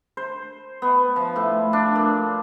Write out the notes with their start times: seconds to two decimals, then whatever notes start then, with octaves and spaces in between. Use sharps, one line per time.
0.17 C5
0.82 B3
1.16 F3
1.36 A2
1.73 D4
1.96 A#2